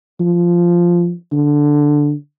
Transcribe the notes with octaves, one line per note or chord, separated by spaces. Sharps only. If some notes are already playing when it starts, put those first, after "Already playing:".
F3
D3